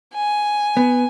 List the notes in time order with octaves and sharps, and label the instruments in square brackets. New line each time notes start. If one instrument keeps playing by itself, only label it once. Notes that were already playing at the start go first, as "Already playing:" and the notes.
[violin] G#5
[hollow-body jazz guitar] B3